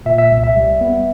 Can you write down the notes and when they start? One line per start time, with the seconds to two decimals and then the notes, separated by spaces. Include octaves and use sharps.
0.06 A#2 E5
0.18 E5
0.31 C2
0.44 E5
0.56 G3
0.81 B3